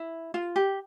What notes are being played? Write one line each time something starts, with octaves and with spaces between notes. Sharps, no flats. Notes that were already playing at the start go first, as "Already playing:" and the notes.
Already playing: E4
F4
G4